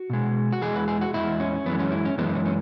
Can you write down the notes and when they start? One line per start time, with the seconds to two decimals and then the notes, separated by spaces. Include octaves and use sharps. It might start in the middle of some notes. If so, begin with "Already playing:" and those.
Already playing: F#4
0.10 B2 G#3
0.53 F#4
0.62 E2 E3 G#3 G#4
0.75 B4
0.88 G#4
1.01 F#4
1.14 E2 E3 G#3 E4
1.40 C#4
1.66 F#2 E3 G#3 B3
1.79 C#4
1.92 E4
2.05 C#4
2.18 F#2 E3 G#3 B3
2.35 C#4
2.46 C#4